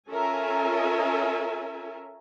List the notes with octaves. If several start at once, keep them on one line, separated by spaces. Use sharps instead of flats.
C#4 F4 A4 A#4 E5 G#5